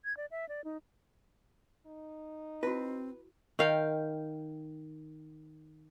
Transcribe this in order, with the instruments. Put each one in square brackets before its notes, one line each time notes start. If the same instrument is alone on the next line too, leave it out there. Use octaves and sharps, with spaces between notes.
[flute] G#6
D5
E5
D5
D#4
[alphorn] D#4
[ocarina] C4 [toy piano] E4 F#4 [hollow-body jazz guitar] B4
[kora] D#3 F5 G5